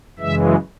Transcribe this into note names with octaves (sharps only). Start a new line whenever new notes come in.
F#2 C#3 E3 G#3 E5